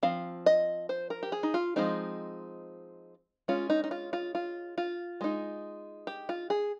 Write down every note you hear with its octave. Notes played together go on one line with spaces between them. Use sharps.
F3 C4 F5
D#5
C5
A#4
G4
G#4
D#4
F4
F3 G#3 C4 D#4
G#3 C#4 F4
D#4
D#4
F4
F4
F4
F4
G#3 D#4
G4
F4
G#4